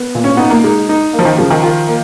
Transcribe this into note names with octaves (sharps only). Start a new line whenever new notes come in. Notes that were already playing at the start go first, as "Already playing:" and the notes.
Already playing: B3
A#2
C#4
B3 D#4
A#3
G#3 D#4
D#4
A#3
F3
D#3
C#3 F3
D#3
F4
A#3